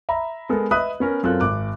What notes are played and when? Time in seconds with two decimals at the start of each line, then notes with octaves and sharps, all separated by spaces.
0.09 E5 A#5 B5
0.49 G#3 B3 A4 A#4
0.71 B4 D#5 E5 B5 D#6 F#6
1.00 B3 C#4 A#4
1.23 F#2 C4 F4 A4 A#4 F#6
1.40 G#1 D6 F#6